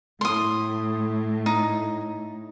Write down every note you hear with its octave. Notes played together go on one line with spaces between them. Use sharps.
A2 C6 D#6
D#4